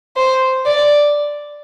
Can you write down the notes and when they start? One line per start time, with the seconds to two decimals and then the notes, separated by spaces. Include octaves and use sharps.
0.17 C5
0.66 D5